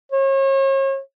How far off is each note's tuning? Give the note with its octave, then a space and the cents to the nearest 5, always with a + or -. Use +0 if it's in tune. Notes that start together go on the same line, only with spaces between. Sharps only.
C#5 -40